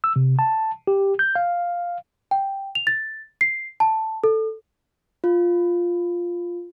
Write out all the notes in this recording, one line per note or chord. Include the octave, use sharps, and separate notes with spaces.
E6
C3
A5
G4
G6
F5
G5
F7
A6
C7
A5
A4
F4